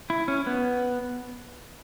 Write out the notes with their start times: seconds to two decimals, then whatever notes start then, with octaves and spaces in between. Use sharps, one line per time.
0.10 E4
0.28 C#4
0.46 B3